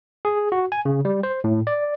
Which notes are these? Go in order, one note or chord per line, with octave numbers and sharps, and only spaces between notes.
G#4
F#4
G#5
C#3
G3
C5
A2
D5